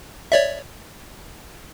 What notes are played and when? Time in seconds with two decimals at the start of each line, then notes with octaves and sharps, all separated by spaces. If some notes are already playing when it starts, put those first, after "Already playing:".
0.32 C#5 D5 E5